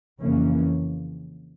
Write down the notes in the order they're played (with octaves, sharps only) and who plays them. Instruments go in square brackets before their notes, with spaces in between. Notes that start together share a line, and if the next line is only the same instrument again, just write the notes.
[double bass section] F2 C#3 E3 A#3 C#4